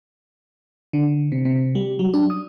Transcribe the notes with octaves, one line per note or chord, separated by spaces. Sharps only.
D3
C3
C3
G3
F#3
D4
D#6